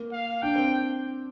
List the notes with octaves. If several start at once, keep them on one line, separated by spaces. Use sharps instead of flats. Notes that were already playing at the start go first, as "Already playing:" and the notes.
Already playing: A#3
F5
D4 G5
C4